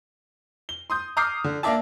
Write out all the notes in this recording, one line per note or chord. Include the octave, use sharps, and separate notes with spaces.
G7
C6 D#6 G6
A#5 D6 D#6 F6 G6 C7
D3
A#3 D4 D5 E5 A5